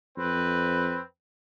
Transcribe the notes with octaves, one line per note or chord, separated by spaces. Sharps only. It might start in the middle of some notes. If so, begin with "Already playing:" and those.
F2 C4 B4